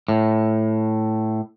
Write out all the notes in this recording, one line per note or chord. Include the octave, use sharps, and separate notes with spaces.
A2